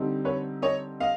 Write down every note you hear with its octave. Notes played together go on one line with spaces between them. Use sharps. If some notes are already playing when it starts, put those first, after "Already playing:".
Already playing: D3 G3 C4 D#4
B4 C#5
C#5 D#5
D#5 F5